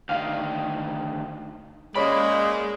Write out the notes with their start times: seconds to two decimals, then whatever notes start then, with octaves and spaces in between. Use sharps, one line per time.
0.09 D2 D#3 F5
1.95 G#3 A#3 C#4 D5 B5